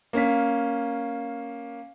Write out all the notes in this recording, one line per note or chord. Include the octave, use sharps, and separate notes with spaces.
A#3 C#4 F5 B6